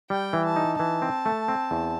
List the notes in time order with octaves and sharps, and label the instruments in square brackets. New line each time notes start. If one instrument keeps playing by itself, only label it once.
[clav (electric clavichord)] G3 [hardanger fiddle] G5
[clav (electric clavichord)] E3
[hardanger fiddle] A5
[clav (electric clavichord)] D#4
[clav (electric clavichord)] E3 [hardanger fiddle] A5
[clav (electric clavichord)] C4
A3
C4
E2